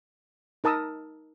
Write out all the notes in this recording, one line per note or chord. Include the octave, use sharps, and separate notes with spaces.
D#4 A#4 A5 D#6 E6